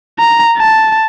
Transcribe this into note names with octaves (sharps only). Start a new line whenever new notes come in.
A#5
A5